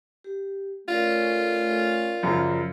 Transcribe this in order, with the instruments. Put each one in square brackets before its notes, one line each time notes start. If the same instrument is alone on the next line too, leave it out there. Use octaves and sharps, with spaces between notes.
[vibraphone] G4
[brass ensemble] A3 C#4 [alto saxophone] F4 [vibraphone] A#4 D5
[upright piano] F#2 C#3 F3